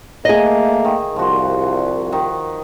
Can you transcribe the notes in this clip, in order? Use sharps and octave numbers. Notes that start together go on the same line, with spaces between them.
A3 A#3 G#4 D#5
D#3
C2 F3 F#4
D#3